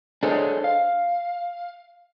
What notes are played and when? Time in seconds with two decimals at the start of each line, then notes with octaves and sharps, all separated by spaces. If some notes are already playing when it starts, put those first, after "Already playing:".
0.23 D4 G#4 A4 C5 C#5 D#5
0.64 F5